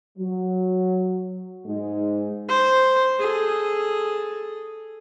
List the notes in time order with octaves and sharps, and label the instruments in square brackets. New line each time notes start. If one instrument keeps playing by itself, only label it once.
[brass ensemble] F#3
[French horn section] G#2 G#3 D#4
[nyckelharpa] C5
G#4 A4